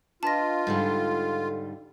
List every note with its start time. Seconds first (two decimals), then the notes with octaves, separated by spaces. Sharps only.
0.23 D4 F4 B4 D#5 A5 A#6
0.67 G#2 D3 G3 A4